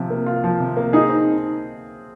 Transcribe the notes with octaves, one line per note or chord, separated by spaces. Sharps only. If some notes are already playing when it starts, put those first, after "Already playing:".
Already playing: C3 F3 F4
A#3
F4
F3
C3
A#3
D#4 G#4
C4